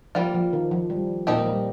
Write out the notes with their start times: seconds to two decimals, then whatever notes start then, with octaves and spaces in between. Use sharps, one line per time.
0.15 F3 G3 A#3 F4
0.34 F3
0.53 D#3
0.71 F3
0.90 G3
1.27 A#2 F3 A#3 C4 D#4 G4
1.46 G3